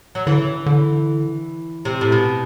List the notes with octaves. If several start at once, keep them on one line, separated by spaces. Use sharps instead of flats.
F#3
D3 E3
D3
C3
A2
B2